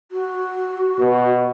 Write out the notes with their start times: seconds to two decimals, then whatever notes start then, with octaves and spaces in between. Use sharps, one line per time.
0.11 F#4
1.00 B2